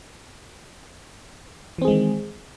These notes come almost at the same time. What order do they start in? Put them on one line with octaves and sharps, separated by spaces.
E3 C4 G#4 G#3 D#3